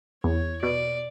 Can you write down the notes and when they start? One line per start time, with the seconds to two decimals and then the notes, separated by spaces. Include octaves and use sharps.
0.23 E2 C#5
0.62 B2 D5